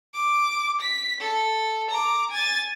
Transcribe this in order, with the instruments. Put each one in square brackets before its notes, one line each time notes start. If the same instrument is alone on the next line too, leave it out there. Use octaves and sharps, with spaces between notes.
[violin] D6
B6
A4
A#5 D6
G#5 A6